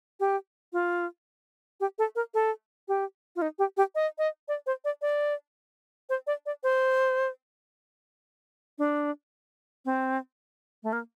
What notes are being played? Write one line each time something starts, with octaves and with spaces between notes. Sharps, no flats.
G4
F4
G4
A4
A#4
A4
G4
F4
D#4
G4
G4
D#5
D#5
D5
C5
D5
D5
C5
D5
D5
C5
D4
C4
A3
A#3